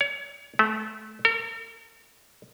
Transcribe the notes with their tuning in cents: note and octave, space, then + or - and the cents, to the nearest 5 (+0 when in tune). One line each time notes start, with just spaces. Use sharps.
C#5 +30
A3 -25
A#4 -45